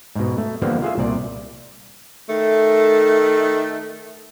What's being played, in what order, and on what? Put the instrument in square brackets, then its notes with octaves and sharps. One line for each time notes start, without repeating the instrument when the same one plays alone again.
[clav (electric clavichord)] G#2 B2
A3
D3 E3 F3 G3 A#3 B3
F4 G#4 E5
C2 A#2 D5
[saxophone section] D#3 A3